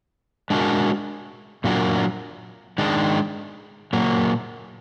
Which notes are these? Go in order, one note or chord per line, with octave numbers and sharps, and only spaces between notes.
G#3 D4 F#4 A#4
A#2 F#3 D4 F4 A#4
D#3 G#3 D4
A#2 F#3 A#3